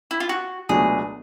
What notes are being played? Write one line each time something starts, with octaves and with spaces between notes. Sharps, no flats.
E4
F4
F#4
C#2 B2 F#3 A3 D4 G#4